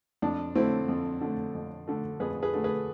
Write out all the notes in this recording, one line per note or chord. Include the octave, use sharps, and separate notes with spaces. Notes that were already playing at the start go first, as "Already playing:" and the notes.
F2 D4
D3 A3 C4 E4
F2
D3 A3
F2
D3 A3
F2 G#4 B4
G#4 B4
D3 A3
G#4 B4